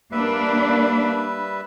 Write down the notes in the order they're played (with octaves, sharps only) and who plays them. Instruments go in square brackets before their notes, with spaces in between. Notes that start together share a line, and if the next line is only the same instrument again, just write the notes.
[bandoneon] G3 B4 E5 [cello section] A#3 D4